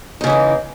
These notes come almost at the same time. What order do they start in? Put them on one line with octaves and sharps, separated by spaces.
D#4 C#3 E3 A3 A#3